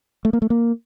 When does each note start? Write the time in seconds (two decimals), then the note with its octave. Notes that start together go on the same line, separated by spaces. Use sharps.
0.25 A3
0.33 A#3
0.42 A3
0.50 A#3